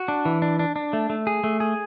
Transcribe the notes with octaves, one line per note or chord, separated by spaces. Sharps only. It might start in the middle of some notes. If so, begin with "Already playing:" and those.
Already playing: F#4
D4
E3
D4
D4
D4
A3
A3
G#4
A3
G#4